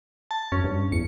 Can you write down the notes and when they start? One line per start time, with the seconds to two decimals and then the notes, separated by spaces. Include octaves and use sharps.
0.31 A5
0.52 F#2 C#4
0.64 G2
0.92 E2 C#7